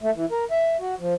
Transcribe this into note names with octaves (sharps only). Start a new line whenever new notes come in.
A3
E3
A#4
E5
F#4
F3